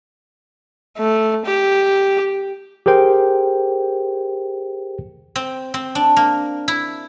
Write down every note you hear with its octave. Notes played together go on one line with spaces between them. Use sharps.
A3
G4
G4 G#4 A#4 C5 G5
C4
C4
D4
A#3
E4